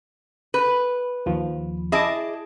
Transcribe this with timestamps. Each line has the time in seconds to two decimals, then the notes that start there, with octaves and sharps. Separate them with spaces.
0.54 B4
1.26 D#2 F3
1.92 E4 G#4 D#5 A5 D6